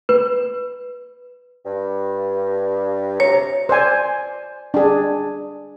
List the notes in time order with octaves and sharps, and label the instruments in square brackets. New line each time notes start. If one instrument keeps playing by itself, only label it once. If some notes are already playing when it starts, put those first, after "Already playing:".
[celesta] B4
[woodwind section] G2
[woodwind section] D2 C3 A#5 [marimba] C#5
[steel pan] C5 D5 G#5
D4 G#4